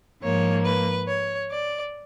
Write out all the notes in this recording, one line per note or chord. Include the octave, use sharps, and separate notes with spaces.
G#2 F3 A#3 C#5
B4
C#5
D5